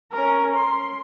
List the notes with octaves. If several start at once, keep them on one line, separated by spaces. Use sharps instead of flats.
C#4 A#4
C6